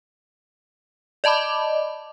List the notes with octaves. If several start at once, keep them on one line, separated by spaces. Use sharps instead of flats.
D5 D#5 A5 B5 D6